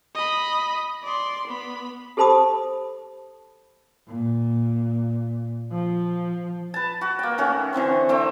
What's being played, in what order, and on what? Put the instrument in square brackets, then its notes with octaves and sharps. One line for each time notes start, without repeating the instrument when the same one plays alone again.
[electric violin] D#5 B5
D5 C6
B3 B5
[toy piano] G4 A4 C5 A5 B5 D#6
[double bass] A#2
F3
[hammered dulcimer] B4 A5
F#4
A#3 G5
D#3 A3 C#4 F#4
D3 E3 C4 C#6
A3 C4 G5